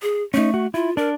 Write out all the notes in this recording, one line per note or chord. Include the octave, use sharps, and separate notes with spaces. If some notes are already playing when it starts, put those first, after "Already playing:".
G#4
A3 C#4 D#4
F#4
E4 F4
D4 A#4